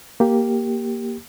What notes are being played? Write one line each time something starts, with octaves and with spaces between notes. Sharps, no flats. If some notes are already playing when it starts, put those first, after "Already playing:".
A#3 G4